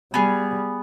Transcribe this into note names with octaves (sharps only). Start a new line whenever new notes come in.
G3 B3 G#4